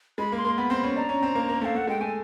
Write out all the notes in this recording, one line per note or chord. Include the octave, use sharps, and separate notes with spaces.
G#3 B5
A#3
C6
A#3
B3 B5
C4 C6
B5
C#4
D4 A#5
C#4
C4
A#3
A#3
A3 F5
A3 F#5
G#3 G5
A3 G#5